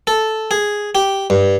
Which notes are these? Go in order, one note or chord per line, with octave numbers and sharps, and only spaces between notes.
A4
G#4
G4
G2